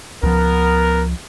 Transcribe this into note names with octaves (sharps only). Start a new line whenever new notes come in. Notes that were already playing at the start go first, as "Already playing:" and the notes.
C#2 F3 B3 A#4